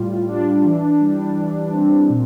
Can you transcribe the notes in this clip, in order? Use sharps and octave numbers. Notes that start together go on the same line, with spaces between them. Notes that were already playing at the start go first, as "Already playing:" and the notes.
Already playing: A2 G3 F4
D4
E3
G3
E3
C4
A#2